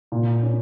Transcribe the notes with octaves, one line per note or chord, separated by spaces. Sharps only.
A#2
C#4